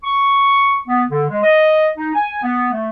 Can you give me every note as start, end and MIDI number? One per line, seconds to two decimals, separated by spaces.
0.04 0.80 85
0.88 1.04 59
1.10 1.24 50
1.29 1.43 56
1.43 1.89 75
1.98 2.13 63
2.15 2.38 80
2.42 2.69 59
2.72 2.90 57